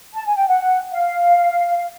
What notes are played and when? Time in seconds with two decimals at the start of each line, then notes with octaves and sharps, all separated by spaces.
0.14 A5
0.26 G#5
0.37 G5
0.48 F#5
0.92 F5